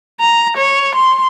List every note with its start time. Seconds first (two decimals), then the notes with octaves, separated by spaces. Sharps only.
0.20 A#5
0.57 C#5
0.95 C6